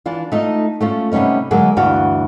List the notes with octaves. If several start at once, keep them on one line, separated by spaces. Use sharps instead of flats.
E3 D4 F4
A3 D#4 F4 D#5
A3 C#4 F4
C3 G3 B3 C#4 D#4
D3 F#3 G#3 A#3 G#4
D2 G2 E3 D4 F#4 F5